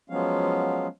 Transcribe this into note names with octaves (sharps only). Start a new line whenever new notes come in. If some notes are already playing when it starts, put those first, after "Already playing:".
F3 F#3 G#3 B3 C#4 F5